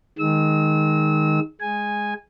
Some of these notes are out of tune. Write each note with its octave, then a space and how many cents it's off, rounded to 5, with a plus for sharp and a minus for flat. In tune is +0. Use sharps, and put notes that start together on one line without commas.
D#3 +0 G#3 +0 E6 -30
G#3 +0 G#5 -10